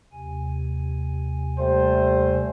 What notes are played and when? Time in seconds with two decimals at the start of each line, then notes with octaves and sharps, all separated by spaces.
0.12 D#2 C3 G#5
1.59 G3 A3 C5